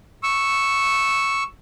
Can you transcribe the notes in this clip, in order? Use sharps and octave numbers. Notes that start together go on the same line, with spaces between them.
C#6 E6